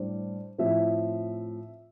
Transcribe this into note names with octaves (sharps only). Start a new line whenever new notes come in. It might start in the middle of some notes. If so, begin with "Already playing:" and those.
Already playing: A2 G3 D4 C5
A2 F3 C4 E5